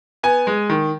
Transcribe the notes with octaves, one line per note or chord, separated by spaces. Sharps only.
B3 G#5
G#3
D#3